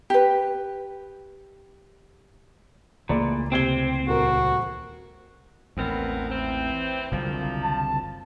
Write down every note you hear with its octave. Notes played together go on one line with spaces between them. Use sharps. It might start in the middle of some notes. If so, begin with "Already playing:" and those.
G4 B4
C#2 A#2 E3 A3 G#4 D5 B5
C3 C4 G#6 G7
D#1 F#4 A#4
A1 D#2 B3 C4 A#4
E3 C4
F#1 C2 A#2 D3 F3
A5